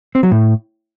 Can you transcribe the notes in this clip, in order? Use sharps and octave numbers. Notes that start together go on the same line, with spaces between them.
C4
F#3
A2